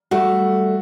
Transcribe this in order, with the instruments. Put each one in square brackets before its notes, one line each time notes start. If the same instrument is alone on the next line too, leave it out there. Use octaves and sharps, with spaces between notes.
[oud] G3 A3 [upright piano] F#4